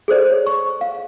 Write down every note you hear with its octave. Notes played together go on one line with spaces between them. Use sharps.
G#4 A4 C5 D5
C#5
C#6
F5